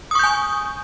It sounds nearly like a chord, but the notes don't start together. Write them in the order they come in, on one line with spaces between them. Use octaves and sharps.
D#6 C#6 G6 G#5